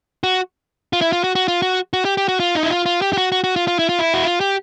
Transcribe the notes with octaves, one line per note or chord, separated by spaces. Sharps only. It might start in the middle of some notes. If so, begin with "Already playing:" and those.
F#4
F4
E4
F4
F#4
F#4
F4
F#4
F#4
G4
G4
F#4
F4
D#4
E4
F4
F4
G4
G4
F#4
F#4
F#4
F4
F4
E4
F4
E4
F#4
F4
G4